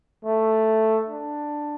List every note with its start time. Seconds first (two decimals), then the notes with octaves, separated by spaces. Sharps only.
0.25 A3
1.08 D4